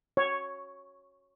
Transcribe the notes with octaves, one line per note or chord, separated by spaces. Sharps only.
C#5